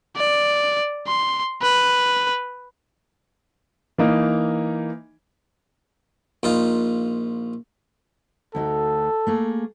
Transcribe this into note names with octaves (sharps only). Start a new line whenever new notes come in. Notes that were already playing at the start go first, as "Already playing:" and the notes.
D5
C6
B4
E3 A#3 D#4
A#1 D#4 F4
D2 D#4 F#4 A4
A3 A#3 G#4